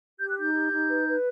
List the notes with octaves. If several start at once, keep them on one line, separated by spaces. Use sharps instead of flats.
G4 G6
F#6
D#4 G6
G4
D#4
B4
B4